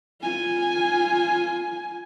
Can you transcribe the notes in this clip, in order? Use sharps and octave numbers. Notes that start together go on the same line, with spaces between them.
F4 G#5